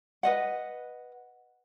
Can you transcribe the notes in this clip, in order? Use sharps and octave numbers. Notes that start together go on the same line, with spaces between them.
B4 D#5 F#5